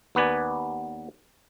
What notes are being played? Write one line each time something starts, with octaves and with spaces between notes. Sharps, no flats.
D#2 B3 B4 D5 G#5